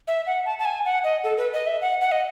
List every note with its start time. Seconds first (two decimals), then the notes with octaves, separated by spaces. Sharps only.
0.08 E5
0.27 F#5
0.46 A5
0.59 A5
0.65 G#5
0.85 F#5
1.04 D#5
1.24 A4
1.37 B4
1.53 D#5
1.67 E5
1.81 F#5
2.01 F#5
2.12 D#5